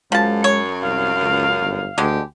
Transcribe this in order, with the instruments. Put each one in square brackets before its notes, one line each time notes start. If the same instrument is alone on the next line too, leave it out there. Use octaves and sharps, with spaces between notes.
[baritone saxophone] F#2 [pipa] F3 A5 [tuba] G#3
[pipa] C#5
[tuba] C2 [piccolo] F5
[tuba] C#2
G1
[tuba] D2 [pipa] D3 G#3 [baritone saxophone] G4